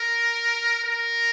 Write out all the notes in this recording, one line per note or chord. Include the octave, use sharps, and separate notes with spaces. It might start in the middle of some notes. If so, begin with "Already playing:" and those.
Already playing: A#4
A#4